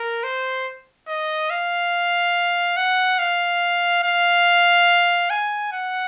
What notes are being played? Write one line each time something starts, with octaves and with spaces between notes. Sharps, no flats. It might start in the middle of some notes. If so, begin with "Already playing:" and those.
Already playing: A#4
C5
D#5
F5
F#5
F5
F5
G#5
F#5